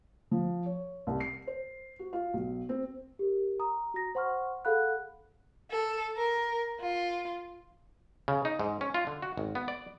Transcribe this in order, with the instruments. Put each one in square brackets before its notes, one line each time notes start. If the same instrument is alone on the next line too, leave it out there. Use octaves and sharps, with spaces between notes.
[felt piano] F3
C#5
C2
C7
C5
F#4
F4
B1
C4
[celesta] G4 A#4
A#5 D#6
F#4 A#5 A#6
C5 F#5 C6 C#6 F6
G#4 A4 F5 F#5 B5 F#6
[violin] A4
A#4
F4
[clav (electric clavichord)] C#3
D#4
G#2
C#4
F4
D3
F#4
G#1
B3
D5